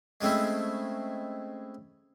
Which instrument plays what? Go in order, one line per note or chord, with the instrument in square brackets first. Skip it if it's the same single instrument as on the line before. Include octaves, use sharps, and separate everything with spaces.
[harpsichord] G#3 A3 C4 C#4 E4